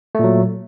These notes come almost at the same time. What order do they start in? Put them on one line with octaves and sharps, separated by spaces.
A3 A#2 F#3